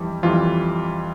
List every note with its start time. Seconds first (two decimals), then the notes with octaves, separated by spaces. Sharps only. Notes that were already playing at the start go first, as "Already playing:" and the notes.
Already playing: F2 E3 G3
0.23 F2 E3 G3 F4